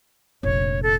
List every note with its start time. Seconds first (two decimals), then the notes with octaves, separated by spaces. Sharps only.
0.43 F1 A#1 C#5
0.83 A4